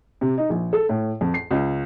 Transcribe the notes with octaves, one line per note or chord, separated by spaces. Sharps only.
C3
D#4
A#1
A4
A2
F2
C7
C#2